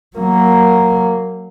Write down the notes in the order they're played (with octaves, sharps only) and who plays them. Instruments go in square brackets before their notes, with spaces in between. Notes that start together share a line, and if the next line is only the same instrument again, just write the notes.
[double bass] F#3 A#3